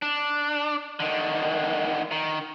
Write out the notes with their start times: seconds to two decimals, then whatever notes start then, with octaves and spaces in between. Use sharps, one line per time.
0.02 D4
1.00 D3 D#3
2.12 D#3